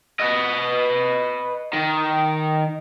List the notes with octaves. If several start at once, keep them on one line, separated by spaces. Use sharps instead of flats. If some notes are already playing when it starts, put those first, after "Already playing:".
B4 D#5
D#3